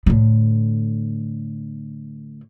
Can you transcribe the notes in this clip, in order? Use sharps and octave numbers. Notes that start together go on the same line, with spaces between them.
A2 D3